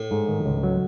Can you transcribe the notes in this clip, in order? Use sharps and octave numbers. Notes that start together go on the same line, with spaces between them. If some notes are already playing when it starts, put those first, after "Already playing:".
Already playing: A2
G#2
D#3
C#2
F#3